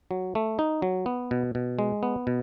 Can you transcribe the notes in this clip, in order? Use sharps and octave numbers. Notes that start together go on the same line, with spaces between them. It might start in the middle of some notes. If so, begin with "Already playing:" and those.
F#3
A3
D#4
F#3
B3
B2
B2
G#3
B3
B2